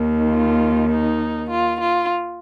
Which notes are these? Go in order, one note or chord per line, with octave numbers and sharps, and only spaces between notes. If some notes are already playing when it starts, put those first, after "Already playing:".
Already playing: D#2 D#3
F4
D#4
F4
F4